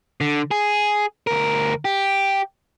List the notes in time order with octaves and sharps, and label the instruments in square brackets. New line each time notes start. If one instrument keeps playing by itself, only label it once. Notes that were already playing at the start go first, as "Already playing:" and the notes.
[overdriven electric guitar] D3
G#4
D2 A#4
G4